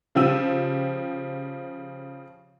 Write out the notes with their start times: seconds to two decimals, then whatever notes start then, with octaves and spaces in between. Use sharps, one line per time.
0.15 C#3 F3 G4 E6 D#7